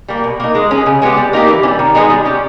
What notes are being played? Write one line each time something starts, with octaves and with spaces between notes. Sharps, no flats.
G3 A#3
B2
A#3 D#4
G#3
C#4 G#4
C#3
G#3 B3 G4
G3
A#3 D#4 G4
E3
C#4
G3
D#3
G#3 B3 D#4 G#4
G3
C#4 G4